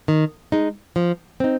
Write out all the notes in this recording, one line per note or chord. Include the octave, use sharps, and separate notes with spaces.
D#3
G#3 D#4
F3
C4 D#4